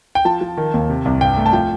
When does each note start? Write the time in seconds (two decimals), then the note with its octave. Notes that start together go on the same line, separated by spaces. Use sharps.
0.15 G5
0.25 F3 A5
0.41 F3
0.57 D#3
0.74 D#2
0.89 C3
1.05 C2
1.21 G2 G5
1.37 A3
1.46 A5
1.53 F3 G5